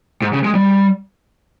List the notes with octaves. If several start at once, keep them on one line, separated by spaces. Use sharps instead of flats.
G#2
C#3
G#3
G3